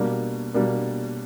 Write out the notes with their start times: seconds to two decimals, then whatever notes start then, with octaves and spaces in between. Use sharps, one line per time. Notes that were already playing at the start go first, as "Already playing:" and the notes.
Already playing: B2 G3 A#3 D4
0.54 B2 G3 A#3 D4